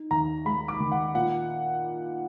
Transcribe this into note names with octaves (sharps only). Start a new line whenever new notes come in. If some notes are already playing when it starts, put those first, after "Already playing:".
Already playing: D#4
D#2 A#5
G#3 B5
D6
D#3
F#5
A#2 F#5